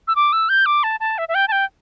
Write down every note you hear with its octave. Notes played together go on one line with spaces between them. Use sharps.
E6
D6
E6
G6
D6
A5
A5
E5
E5
G5
A5
G5